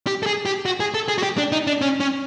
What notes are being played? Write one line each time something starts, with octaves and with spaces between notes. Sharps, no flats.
G4
A4
G#4
G4
F#4
G#4
A4
G#4
F#4
G4
D4
D#4
D4
C#4
C#4